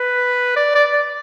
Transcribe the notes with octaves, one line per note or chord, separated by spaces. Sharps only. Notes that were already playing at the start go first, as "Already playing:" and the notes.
Already playing: B4
D5
D5
D5